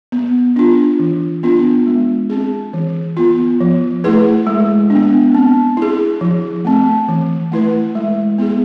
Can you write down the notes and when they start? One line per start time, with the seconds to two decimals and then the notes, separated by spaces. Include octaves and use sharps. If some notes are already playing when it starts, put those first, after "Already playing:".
0.12 B3
0.56 D4 F4
0.99 E3
1.43 B3 D4 F4
1.87 G#3
2.30 C4 G#4
2.73 E3
3.17 B3 F4
3.60 F3
4.04 A3 E4 G#4 B4
4.47 G#3
4.90 D4
4.95 B3
5.35 C4
5.77 E4 G#4
6.21 F3
6.65 A3 C4
7.08 E3
7.52 A3 E4 B4
7.95 G#3
8.38 B3 E4 G#4